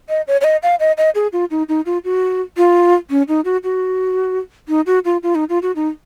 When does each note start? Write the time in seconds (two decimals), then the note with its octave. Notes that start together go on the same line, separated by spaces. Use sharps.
0.09 D#5
0.28 C#5
0.41 C#5
0.44 D#5
0.63 F5
0.80 D#5
0.98 D#5
1.15 G#4
1.33 F4
1.51 D#4
1.69 D#4
1.86 F4
2.04 F#4
2.57 F4
3.10 C#4
3.28 D#4
3.45 F#4
3.64 F#4
4.69 D#4
4.87 F#4
5.05 F4
5.23 F4
5.35 D#4
5.49 F4
5.62 F#4
5.76 D#4